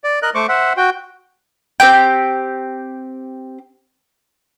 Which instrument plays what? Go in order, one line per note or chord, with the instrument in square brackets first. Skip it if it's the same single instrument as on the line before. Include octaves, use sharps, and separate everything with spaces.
[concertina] D5
A#4 D#5 F#6
A3 C5 C#6 D6
C5 E5 F#5
F#4 G5
[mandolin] C4 G4 G5